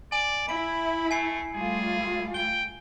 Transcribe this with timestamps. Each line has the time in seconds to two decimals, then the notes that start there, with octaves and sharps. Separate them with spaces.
0.12 D5 G#5
0.49 E4 B5 D7
1.11 A3 G#5 C7
1.54 G3 A3 F4 G#4
2.34 G5 G7